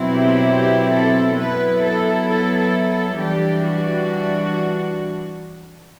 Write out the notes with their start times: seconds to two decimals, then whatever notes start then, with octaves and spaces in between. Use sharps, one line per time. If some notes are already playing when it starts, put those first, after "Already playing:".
Already playing: B2 F#3 C4 E4
0.15 G4
0.46 G4
0.91 A4
1.37 F#3 B3 E4 B4
1.82 A4
2.28 A4
2.58 A4
2.89 A4
3.19 E3 G3 D4 G4
3.65 F#4